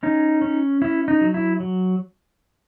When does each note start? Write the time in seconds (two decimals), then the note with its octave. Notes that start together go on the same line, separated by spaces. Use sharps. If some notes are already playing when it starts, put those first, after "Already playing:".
0.03 C#4 D#4
0.42 C#4
0.82 C#4 E4
1.08 D#4
1.21 F#3
1.34 E4
1.60 F#3